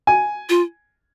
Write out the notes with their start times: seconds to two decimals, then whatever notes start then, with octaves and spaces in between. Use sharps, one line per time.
0.07 G#5
0.49 F4